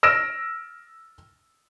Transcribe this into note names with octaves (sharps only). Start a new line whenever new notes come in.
E6 F6 A#6 D7 E7